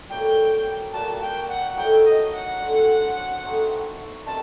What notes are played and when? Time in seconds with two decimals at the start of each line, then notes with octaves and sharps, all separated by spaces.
0.10 A2 G3 A#3 F#4 G5
0.93 A#2 G3 A#3 F#4 A5
1.21 G5
1.48 F#5
1.76 A2 F#3 A3 D#4 G5
2.04 D#5
2.32 F#5
2.60 D3 F#3 C4
3.43 A3 C4 D#4 F#4
4.26 C3 D#3 G3 C4 A5